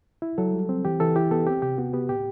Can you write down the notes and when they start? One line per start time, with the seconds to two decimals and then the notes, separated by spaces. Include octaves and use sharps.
0.22 E4
0.38 F#3 A4
0.54 G3
0.69 C4
0.85 E3 G4
1.00 E3 A4
1.16 E4 G4
1.31 B3 A4
1.46 C4 G4
1.62 C3 G4
1.78 B3 F#4
1.93 B3 G4
2.09 A2 G4